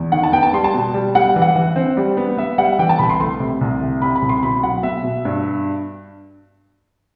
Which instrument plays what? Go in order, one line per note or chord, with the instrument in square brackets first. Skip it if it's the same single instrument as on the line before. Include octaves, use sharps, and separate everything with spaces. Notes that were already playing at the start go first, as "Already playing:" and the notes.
Already playing: [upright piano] E2
D#3 F#5
A5
B3 G5
A5
G3 C6
A5
B2
G3
G3 F#5
E3
F#5
E3
C4
G3
B3
B3 E5
G3 F#5
E3 G5
A5
C2 B5
C6
A3 C6
C3
C2
C3
C3 B5
B5
C2
C6
B2 B5
F#3 F#5
B2 E5
B2
G2